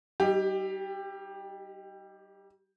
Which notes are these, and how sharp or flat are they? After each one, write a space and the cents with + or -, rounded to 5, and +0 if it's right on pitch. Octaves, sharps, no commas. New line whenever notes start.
G3 -35 D#4 +0 G4 +15